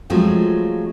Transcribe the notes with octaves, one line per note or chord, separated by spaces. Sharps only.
F3 F#3 G#3 A3 C4 F4